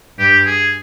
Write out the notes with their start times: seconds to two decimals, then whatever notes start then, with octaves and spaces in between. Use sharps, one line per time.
0.19 G2 G4
0.47 G#4